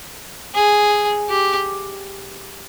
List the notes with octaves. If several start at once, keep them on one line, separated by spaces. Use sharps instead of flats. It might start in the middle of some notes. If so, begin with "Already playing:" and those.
G#4
G4